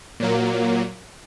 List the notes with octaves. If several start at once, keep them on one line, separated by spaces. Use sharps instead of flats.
A#2 F#3 A#3